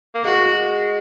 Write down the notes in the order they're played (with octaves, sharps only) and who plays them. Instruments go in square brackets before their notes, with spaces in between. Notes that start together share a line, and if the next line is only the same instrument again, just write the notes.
[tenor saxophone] A#3
[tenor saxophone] G#3 [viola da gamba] F#4